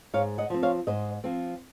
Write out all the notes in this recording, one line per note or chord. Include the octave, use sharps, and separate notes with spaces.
G#2 C#5 F5
D#5 F#5
F3 C4
C#5 F5
G#2 C5 D#5
F3 C4